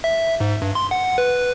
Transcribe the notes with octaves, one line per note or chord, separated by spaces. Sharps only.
E5
G#2
G2
C6
F#5
B4